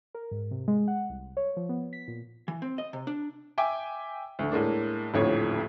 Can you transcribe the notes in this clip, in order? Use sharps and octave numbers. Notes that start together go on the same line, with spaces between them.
A#4
G#2
C3
G#3
F#5
C2
C#5
F3
B3
B6
A#2
E3
C4
D#5
C3
D4
E5 G5 G#5 D6
D2 D3
A2 G#3 A#3 D4
D#1 A1 F2 A2 D3 C#5